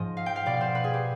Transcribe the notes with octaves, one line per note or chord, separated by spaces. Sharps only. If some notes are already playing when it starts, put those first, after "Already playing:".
Already playing: G#2 F3 D#5
F5
G5
F5
B2 D5
C5
B4
G#4
G4